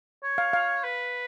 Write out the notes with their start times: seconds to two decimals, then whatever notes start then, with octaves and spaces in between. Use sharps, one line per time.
0.24 C#5
0.38 F5
0.53 F5
0.84 B4